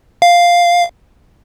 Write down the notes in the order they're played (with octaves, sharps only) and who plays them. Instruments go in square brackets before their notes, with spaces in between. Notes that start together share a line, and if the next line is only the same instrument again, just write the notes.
[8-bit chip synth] F5